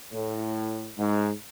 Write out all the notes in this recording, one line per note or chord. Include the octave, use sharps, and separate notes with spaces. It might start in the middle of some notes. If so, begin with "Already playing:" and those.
A2
G#2